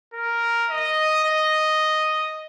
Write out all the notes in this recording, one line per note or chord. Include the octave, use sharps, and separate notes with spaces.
A#4
D#5
D#5